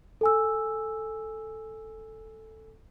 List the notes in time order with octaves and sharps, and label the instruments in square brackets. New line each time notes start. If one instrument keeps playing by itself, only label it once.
[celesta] A4 G#5 E6